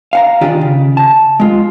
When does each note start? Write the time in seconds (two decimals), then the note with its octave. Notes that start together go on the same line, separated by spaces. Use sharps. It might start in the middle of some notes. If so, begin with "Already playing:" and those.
0.13 F5 F#5 A#5
0.41 D#3 D4 F4 G4 G#4 D5
0.61 C#3
0.97 A5
1.40 G#3 F4